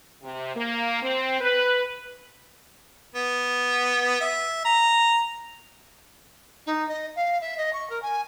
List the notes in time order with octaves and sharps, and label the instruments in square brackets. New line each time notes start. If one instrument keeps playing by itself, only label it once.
[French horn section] C3
A#3
C4
B4
[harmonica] B3
E5
A#5
[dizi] D#4
D#5
F5
E5
D#5
C#6
A#4
G#5